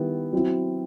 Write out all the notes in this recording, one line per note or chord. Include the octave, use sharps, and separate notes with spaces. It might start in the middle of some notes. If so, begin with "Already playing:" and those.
Already playing: D#3 G3 B3 E4
F#3 C4 E4